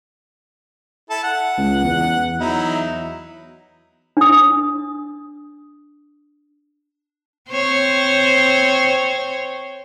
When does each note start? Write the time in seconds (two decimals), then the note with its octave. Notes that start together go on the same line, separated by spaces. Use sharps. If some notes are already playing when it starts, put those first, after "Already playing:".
1.10 E4 A4 A5
1.23 F#5
1.58 C#2
1.84 E2
2.40 E2 F#3 D#4 E4
4.17 D4 D#6
7.51 C4 C5 C#5